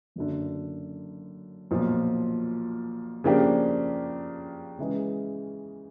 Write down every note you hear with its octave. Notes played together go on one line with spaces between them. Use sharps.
F#1 F#2 D3
B1 A#2 F3
C#3 F3 A#3 D4 G4
C#3 E3 G#3